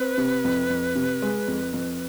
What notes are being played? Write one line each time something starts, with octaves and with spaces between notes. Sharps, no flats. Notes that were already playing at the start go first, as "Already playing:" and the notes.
Already playing: C4 B4
C3
F2
F2
C3
G#3
F2
F2